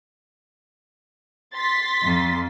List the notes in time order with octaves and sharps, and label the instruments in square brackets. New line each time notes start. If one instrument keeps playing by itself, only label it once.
[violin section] C6 A6 B6
[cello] F2